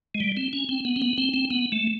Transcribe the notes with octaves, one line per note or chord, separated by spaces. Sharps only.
G#3
G3
C4
C#4
C4
B3
C4
B3
C4
C4
B3
A3